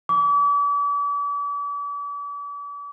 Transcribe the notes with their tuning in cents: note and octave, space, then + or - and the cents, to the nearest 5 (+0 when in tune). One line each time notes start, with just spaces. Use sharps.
D6 -40